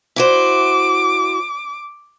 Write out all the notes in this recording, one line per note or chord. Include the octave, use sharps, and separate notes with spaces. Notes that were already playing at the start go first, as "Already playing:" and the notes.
E4 F#4 C5 D6